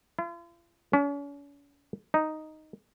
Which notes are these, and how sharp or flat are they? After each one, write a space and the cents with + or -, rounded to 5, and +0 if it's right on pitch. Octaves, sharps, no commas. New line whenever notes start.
F4 -45
C#4 +40
D#4 +0